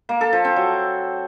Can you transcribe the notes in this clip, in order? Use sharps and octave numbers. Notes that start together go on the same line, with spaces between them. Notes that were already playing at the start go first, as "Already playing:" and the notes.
A#3
A4
F3
C4
F#3